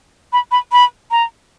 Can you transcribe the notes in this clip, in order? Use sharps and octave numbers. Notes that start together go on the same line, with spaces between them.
B5
B5
B5
A#5